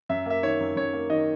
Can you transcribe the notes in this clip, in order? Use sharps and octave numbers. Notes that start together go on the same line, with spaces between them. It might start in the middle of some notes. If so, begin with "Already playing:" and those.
F#2 E5
A#3 E5
D#3 C#5
F#2
F#2 C#5
A#3
D#3 D#5